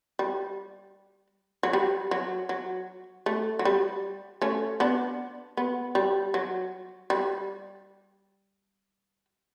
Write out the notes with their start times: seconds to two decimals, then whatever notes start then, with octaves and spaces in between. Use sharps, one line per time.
0.19 G3
1.63 F#3
1.73 G3
2.11 F#3
2.49 F#3
3.26 A3
3.59 F#3
3.65 G3
4.42 A3 C#4
4.80 B3 D4
5.57 B3
5.95 G3
6.34 F#3
7.10 G3